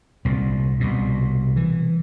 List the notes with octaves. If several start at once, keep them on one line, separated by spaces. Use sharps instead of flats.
C2 A#2
C2 B2
E3